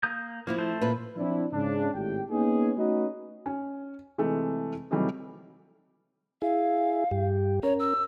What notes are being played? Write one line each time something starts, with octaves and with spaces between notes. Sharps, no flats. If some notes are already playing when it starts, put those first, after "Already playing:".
A#3 D#6 G6
F3 A#3 C4 E4
A3 C5
A#2 F4 B4
F3 C4 D4 E4
G#2 C#3 D4
G#1 A2 G4 G5
A#3 B3 C#4 D#4 G#4
A3 C#4 D#4 F#4 B4 D#5
C#4
C3 E3 G#3 A3
C3 D#3 E3 F#3 G3 A3
E4 G#4 F5
G2 G4
C#4 A#4 C#5
E6